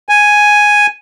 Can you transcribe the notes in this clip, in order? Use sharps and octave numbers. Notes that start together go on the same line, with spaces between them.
G#5